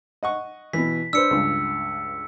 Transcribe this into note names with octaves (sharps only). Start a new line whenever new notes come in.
D#5 F#5 C#6
B2 E3 B6
D4 B4 C5 E6 C#7
C#2 G2